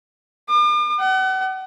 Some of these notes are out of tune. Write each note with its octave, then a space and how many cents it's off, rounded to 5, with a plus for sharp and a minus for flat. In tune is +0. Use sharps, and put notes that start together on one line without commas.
D6 +45
F#5 +35